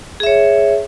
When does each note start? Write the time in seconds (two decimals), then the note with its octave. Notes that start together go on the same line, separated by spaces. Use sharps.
0.20 G#4
0.23 E5
0.27 C#5